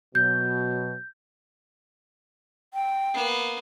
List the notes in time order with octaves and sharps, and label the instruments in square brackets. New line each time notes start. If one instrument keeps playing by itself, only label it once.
[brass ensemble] B2 F#3 [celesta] G6
[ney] G5
[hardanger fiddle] A#3 B3